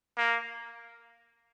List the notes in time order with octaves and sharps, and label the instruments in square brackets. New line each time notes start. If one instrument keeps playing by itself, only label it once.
[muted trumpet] A#3